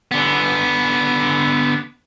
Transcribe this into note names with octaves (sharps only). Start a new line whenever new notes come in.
D3 B3